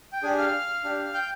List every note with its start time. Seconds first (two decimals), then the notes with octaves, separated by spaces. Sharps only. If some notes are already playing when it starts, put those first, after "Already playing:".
0.12 G5
0.23 D4 G4 G#4 G#5
0.38 F5 F6
0.84 D4 G4
1.14 G5 G6